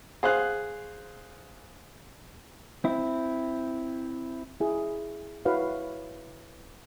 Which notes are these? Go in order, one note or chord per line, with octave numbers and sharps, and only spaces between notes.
G#4 C5 F5 F#6
C4 E4
E4 G#4
E4 F#4 B4 C#5 F5